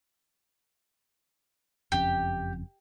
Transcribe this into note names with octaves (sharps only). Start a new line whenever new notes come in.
F#1 F2 C#4 G4